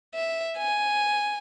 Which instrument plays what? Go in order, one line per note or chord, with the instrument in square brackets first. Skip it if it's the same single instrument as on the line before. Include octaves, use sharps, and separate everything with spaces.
[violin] E5
G#5